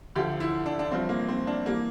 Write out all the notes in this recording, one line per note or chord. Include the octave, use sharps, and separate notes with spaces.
D2 D3 F3 G4
E4
D4
D4
G1 G2 F3 C4
A#3
C4
D4
E3 G3 A#3